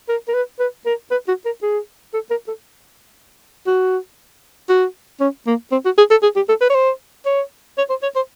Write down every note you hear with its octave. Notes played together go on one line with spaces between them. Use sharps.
A#4
A#4
B4
B4
A#4
B4
F#4
A#4
G#4
A4
A#4
A4
F#4
F#4
C#4
A#3
C4
F#4
G#4
A4
G#4
G4
A4
B4
C#5
C5
C#5
C#5
C5
C#5
C5